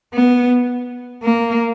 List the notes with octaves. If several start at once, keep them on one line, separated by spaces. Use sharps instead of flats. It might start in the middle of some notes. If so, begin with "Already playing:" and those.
B3
A#3